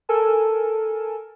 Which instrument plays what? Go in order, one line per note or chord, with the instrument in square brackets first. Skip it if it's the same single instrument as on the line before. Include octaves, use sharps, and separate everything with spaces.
[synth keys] A4 A#4 G#5 A5